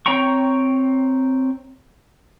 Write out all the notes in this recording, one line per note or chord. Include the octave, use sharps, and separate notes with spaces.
C4 C#5 G5 A#5 C#6